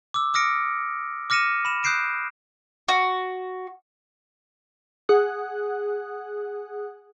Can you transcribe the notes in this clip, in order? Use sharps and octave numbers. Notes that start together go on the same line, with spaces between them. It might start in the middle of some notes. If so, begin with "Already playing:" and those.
D6 E6
D6 D#6 F6 A#6 C#7 D7
D6 F6 A#6 C#7 D#7 E7
B5 E7
D#6 F#6 G6 C7 D7 E7
F#4
G#4 F#5 D#6 F#6